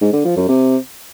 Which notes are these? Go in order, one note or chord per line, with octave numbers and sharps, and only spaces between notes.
G#2
D3
F3
F#2
C3